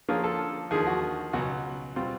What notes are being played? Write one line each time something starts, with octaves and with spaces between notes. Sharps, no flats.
D3 F3 A#3 C#4 F4 G#4
A4
D#2 D3 F3 G#4
F#4
C#2 B2 F#3 F#4
B2 G3 C4 F4